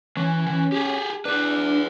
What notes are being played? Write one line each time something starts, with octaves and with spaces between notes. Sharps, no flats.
E3 C#4
E3
G4 G#4
D4 G#4 B4